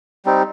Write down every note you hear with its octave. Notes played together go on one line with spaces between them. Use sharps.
G3 C4 D#4